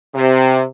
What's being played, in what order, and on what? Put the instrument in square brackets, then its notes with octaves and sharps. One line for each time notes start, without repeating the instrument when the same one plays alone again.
[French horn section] C3